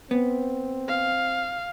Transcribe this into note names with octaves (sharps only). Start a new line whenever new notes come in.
B3 C4
F5